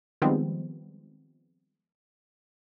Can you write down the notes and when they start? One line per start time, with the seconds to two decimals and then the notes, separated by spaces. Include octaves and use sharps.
0.22 D#3 F3 G3 G#3 B3 C4